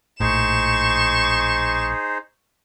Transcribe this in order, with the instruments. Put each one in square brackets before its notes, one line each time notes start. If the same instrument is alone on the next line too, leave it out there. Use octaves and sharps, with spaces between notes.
[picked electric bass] A#1 A2 [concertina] D#4 G#4 C5 [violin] C#6 E7